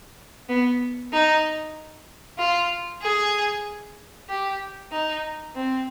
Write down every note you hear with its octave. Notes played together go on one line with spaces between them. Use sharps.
B3
D#4
F4
G#4
G4
D#4
C4